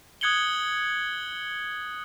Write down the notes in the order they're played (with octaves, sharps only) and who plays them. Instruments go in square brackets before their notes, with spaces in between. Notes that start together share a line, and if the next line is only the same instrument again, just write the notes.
[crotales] D#6 F#6 G#6 C#7 F#7 G7